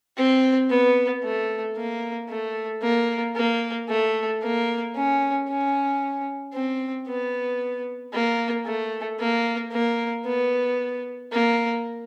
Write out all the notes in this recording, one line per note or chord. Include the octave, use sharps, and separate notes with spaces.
C4
B3
A3
A#3
A3
A#3
A#3
A3
A#3
C#4
C#4
C4
B3
A#3
A3
A#3
A#3
B3
A#3